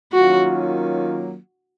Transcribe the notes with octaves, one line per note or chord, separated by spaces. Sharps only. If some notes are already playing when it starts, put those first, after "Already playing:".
D#3 F#3 A#3 C#4 F4 F#4